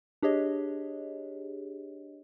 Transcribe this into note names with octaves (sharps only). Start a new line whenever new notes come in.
D4 G4 G#4 C#5 D#5